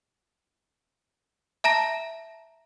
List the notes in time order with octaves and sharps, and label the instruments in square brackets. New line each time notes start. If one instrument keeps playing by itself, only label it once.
[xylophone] E5 A5 A#5 A#6